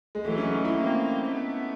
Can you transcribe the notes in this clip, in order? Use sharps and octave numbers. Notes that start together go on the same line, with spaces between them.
G#3
E3 F#3 A3
C#4
D#4
E4
A#3 C4
A3 B3